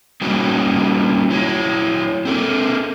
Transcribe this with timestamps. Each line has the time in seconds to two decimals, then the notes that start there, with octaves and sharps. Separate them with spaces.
0.21 G3 A#3 C#4 D#4 F#4
1.31 F#3 E4 C#5
2.25 C4 A4 A#4